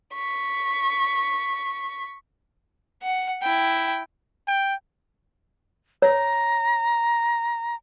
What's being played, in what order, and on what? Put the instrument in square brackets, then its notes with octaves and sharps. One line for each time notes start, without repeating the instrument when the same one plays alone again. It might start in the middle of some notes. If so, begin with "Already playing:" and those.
[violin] C#6 B6
[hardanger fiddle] F#5
E4 G5
[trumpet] G5
[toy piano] C#5 [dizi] A#5